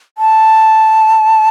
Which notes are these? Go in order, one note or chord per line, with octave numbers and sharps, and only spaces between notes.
A5